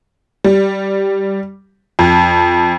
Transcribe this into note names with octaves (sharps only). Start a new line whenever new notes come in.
G3
F2